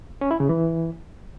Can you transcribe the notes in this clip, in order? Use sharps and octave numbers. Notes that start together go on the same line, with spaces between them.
C#4
E4
C#3
E3